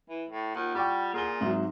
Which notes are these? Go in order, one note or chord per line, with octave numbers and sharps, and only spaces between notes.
E3
A2
D#2 F4 F#5
G3 G5 C#6 D6
A#2 G#4 G7
G#2 F#3 C4 D#4 E5